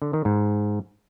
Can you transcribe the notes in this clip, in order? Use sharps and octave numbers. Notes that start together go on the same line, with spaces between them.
D3
D#3
G#2